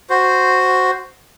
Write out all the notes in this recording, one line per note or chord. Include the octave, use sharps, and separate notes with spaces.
F#4 C5